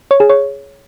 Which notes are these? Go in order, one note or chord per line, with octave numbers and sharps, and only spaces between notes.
C#5
G#4
C#5